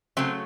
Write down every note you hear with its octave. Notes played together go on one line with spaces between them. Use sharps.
C#3 F#3 A3 C4